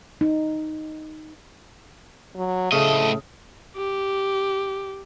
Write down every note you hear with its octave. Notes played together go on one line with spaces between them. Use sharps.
D#4
F#3
A2 C#3 A3 D#5
G4